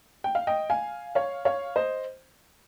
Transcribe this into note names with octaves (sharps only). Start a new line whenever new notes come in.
G5
F5
D#5 G5
F5 G#5
C#5 F5
C#5 F5
C5 D#5